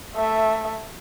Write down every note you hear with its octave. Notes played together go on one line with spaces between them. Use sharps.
A3 E5